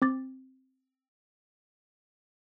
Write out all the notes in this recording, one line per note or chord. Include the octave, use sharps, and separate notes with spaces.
C4 D6 A6